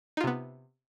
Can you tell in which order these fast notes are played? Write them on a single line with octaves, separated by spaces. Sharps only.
D#4 F4 C3 B3